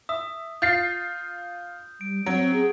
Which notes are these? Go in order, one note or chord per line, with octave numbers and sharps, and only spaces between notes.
E5 D#6
F4 G6 A6 C7
G3 D7
F#3 C4 D7
G#4